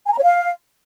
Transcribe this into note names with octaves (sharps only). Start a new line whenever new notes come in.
G#5
A#5
C#5
F5